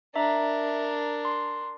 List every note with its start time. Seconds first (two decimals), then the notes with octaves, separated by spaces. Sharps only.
0.16 D4 A#4 E5 A#5
1.25 C6